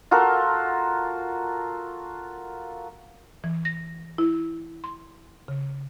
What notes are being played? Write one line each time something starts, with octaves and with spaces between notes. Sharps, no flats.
F4 F#4 A4 A#4
E3
A#6
E4
C6
C#3